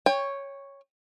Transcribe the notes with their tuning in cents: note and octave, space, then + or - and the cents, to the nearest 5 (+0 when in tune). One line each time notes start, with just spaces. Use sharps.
C#5 +0 G5 +30